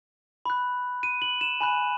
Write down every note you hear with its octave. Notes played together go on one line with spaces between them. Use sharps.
B5 F#6
D#7
F#7
E7
G#5 B5 F#6